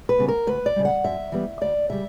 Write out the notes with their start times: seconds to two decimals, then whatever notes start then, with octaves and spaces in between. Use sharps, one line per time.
0.09 B4
0.18 C#3 G3 B3
0.28 A#4
0.47 D2 B4
0.66 D5
0.76 C#3 G3
0.85 F#5
1.04 F#2 E5
1.32 E3 G3 B3
1.61 D2 D5
1.90 C#3 G3 E5